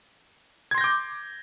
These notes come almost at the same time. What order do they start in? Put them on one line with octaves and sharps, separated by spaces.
G#6 C6 A#6 G6 D6